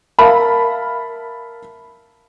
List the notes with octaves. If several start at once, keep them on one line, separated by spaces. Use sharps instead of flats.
A#4 E5 F5 A5 B5